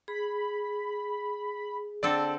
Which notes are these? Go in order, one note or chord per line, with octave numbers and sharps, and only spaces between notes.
G#4 B5
D3 C4 A4 D5 A5